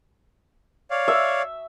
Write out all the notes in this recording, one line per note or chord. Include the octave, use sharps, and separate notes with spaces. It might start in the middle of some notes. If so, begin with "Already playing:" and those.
C#5 D5 F5
E5